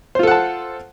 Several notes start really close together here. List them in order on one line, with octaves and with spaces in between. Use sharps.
C5 F4 A4 F#5 A5